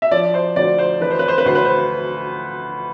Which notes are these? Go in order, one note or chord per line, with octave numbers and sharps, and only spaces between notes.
E5
F3 D5
C5
D2 D5
C5
E3 B4
C5
B4
C5
B4
D2 C5
B4
C5